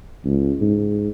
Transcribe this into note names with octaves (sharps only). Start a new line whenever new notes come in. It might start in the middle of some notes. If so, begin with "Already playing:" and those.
C#2
G#2